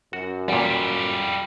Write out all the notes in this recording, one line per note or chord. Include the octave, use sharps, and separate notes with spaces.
F#2 F#4
E2 A#2 G3 F4